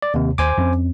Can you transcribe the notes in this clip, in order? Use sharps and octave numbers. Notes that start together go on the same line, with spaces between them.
D5
D#2 C3
D#2 C5 G#5 D6
F2 C4 C#4